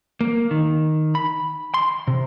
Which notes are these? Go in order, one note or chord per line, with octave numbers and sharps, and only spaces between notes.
A#3
D#3
B5
C6
C3